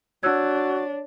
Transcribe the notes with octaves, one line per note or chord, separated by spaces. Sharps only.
D4 F#4 C#5 E6 F#6 G#6